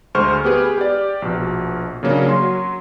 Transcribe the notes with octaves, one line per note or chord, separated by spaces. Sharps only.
D2 G#3 C5 C#6 F6
B3 G4 G#4 B4
G4 D5
A#1 B2
C#3 F#3 A#3 C#4 D4
F#3 C6